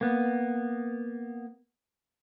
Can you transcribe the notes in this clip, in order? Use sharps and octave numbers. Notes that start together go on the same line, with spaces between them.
A#3 B3